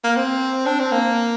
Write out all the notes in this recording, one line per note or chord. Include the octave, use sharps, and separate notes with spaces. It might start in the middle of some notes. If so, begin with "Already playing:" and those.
A#3
C4
D4
C4
A#3